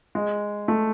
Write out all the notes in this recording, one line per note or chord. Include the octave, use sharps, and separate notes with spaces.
G#3
A3